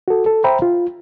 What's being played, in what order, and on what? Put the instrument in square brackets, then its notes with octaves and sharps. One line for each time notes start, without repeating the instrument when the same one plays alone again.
[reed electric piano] F#4 A4
A4
C5 E5 G5 A#5 B5
F4